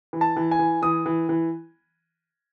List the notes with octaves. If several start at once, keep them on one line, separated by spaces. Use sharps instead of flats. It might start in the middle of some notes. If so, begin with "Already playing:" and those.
E3
A5
E3
G#5
E3
E3 D#6
E3
E3